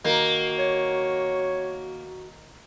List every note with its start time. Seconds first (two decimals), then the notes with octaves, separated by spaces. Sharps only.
0.05 D#3 A#3 F#4
0.59 C#5